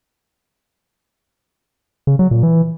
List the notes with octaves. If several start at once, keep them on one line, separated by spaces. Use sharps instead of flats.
C#3
F#3
A#2
E3